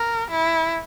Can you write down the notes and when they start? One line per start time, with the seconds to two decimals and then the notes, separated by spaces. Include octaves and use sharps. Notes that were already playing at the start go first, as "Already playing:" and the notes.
Already playing: A#4
0.31 E4